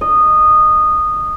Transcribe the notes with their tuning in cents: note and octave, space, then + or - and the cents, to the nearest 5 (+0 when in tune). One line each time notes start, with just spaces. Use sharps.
D#5 -15